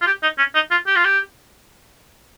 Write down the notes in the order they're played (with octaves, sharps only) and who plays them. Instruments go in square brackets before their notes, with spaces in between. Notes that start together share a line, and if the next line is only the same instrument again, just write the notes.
[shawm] F4
G4
D#4
C#4
D#4
F4
G4
F4
G4